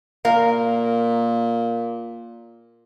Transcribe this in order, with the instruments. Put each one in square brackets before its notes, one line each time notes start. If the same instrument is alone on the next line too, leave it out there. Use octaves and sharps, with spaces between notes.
[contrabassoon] A#2 [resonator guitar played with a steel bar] A#4 F5